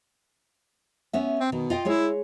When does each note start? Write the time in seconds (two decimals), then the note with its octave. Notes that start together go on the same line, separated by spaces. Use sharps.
1.13 B3 C#4 E5
1.40 C4
1.52 B2 D#3
1.70 F4 D#5 G5
1.85 G#3 E4 G#4 C#5